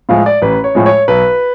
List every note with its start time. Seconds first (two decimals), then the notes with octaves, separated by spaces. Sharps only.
0.09 A2 F3 G#3 F5
0.26 D5
0.42 A1 B4
0.64 C#5
0.75 A2 F3 G#3
0.86 C#5
1.08 B1 B4